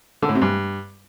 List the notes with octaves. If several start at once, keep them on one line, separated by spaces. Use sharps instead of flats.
D3
A2
C3
G2